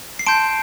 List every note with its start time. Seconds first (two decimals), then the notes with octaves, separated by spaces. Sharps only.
0.19 C7
0.27 A5 C6 G6 D7